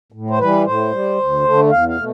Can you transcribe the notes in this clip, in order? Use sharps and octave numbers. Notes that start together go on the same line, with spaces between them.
A2
C5
E3 G3 B4
A2 C5
G3
D2
D3 A3
E2 F5
F5
B2 A3